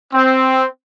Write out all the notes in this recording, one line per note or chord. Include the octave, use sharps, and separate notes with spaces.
C4